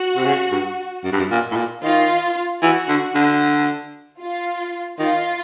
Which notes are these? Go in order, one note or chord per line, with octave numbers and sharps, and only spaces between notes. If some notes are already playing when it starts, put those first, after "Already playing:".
Already playing: F#4
C3
C#3
G2
F#2
G2
F#2
A#2
A2
A#2
D#3 F4
E3 F#4
D3
D3
F4
D#3 F4